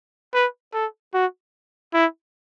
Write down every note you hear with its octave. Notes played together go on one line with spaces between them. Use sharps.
B4
A4
F#4
E4